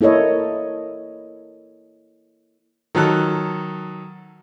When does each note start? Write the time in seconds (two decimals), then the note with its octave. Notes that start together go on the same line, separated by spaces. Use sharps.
0.01 A#3 E4 A4 C#5 D#5
2.95 D#3 F#3 A4 F#6